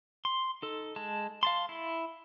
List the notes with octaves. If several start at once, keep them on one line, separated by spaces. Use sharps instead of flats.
C6
D#4 A4
G#3 A5
F5 A5 C6
E4